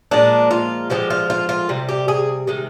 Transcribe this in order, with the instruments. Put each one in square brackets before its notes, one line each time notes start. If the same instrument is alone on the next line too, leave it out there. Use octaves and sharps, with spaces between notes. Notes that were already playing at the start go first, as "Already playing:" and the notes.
[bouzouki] A#2 F3 G#3 D4
F4
D3 F3 G#3 G4
F4
F4
F4
C3 G3
G4
G#4
C3 D#3 G#3